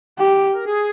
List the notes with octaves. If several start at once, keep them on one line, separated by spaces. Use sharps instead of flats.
G4
A#4
G#4